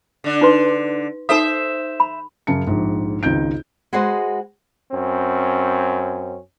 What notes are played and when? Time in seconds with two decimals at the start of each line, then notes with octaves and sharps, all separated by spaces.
0.24 D3 D4
0.41 D#4 B4 C6
1.29 D#4 A4 C5 E5 D#6
2.00 B5
2.47 F#2 C#3 A5 C#7
2.67 A#1 G#2
3.23 G#1 C#2 D#4 G6 D7
3.93 G#3 F#4 G#4 B4 C5 D#5
4.92 F#2 C4 C#4